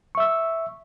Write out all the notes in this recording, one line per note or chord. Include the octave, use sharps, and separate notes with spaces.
E5 C#6 E6